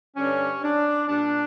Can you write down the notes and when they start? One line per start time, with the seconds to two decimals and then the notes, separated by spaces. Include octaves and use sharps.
0.16 G2 D3 G3 C#4
0.63 D4
1.08 A#2 G3 D4